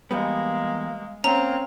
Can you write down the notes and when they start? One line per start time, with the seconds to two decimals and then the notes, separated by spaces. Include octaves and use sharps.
0.11 E2 G3 G#3 A#3 B3
1.24 A#3 C4 C#4 A#5